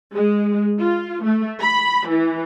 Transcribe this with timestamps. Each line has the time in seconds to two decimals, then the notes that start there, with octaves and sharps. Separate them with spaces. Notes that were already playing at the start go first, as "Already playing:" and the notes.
0.14 G#3
0.80 F4
1.25 A3
1.62 B5
2.09 E3